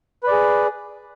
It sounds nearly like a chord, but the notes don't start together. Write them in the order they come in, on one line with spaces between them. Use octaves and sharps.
B4 D5 G#4